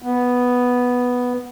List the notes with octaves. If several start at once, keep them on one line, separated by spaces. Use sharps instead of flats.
B3